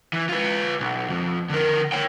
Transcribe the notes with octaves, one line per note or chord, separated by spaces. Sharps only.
E3
F4 B4
B1
F2
D3 A#4
C#5 G5